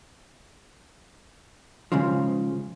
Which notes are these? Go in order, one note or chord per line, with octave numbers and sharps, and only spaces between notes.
G#2 C#3 F3